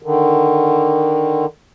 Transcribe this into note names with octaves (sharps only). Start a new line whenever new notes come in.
D3 D#3